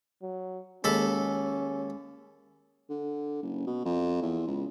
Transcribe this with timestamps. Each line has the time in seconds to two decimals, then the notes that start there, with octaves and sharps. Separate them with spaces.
0.22 F#3
0.84 D#2 G#3 C#4 A4 B5
2.90 D3
3.42 F#1
3.66 B2
3.85 F2
4.22 E2
4.47 C#2